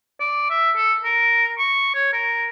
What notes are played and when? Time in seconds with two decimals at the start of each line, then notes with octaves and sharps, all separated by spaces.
0.20 D5
0.50 E5
0.76 A4
1.04 A#4
1.58 C#6
1.95 C#5
2.13 A#4